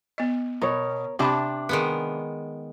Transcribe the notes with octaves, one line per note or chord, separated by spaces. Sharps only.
B3 D#5
B2 A#4 C#5
C3 D4 G4 G5 A5 B5
D#3 G#3 B3